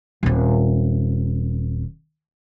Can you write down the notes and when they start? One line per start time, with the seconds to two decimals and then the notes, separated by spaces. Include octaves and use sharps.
0.23 D#1 C4